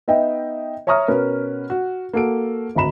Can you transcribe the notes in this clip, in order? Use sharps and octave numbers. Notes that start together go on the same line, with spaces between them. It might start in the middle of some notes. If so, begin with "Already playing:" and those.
B3 D#4 D#5 E5 G5
C#5 E5 A#5 C#6 D#6 F6
B2 C#4 A#4 B4
F#4
A#3 F#4 A4 D7
G#1 D2 A#5 B5 E7